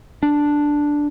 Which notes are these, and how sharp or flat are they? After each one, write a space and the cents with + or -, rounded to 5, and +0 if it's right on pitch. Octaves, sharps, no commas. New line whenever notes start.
D4 +0